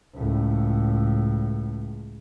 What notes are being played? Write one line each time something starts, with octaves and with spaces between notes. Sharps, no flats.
C#2 A2